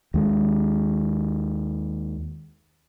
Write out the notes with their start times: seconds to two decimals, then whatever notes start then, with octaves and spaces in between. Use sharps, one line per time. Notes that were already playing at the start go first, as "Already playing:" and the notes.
0.14 D#2 G#3